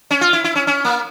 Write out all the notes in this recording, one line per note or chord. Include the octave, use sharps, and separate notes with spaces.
C#4
F4
E4
E4
C#4
C#4
A#3